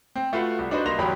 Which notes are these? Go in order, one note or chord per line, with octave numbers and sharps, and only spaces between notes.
C4
A3 F4 F#4 B4 F5 F#5
C2
D4 D#4 F#4 B4 C5
C2 A#3 D#5 C6 A#6 F7
G1 E2 G#2 F#3 G4 B5